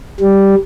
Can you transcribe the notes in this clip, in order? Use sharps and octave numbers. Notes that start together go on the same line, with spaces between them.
G3